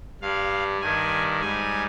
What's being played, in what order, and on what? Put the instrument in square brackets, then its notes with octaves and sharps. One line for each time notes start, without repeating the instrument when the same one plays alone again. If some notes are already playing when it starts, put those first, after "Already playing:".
[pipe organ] G2 G3 F5
G2 D#3 G3 G#5
G#2 G3 G#5